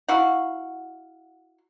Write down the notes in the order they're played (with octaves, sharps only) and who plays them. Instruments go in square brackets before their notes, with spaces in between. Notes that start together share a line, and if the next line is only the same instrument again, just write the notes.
[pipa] E4 F#4 F5 F#5